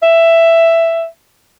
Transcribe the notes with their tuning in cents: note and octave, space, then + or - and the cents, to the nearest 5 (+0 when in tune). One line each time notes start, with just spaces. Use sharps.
E5 +10